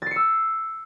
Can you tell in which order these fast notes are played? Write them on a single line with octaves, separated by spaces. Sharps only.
A6 C7 C#7 E6